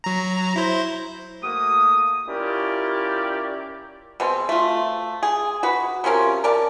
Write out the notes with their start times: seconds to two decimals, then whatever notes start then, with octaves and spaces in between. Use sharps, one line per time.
0.04 F#3 A#5
0.56 E4 C5
1.43 A3 A#3 F#4 D#6
2.28 C#4 E4 F4 G4 A#4 D5
4.20 B2 G#3 C4
4.49 A3 F4
5.23 G#4
5.63 F#4 B4
6.04 C3 F3 C#4 A#4
6.44 A#4 D5 A5